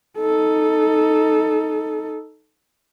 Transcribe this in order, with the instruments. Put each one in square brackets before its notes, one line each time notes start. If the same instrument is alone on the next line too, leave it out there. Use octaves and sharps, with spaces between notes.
[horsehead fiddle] D#4 A4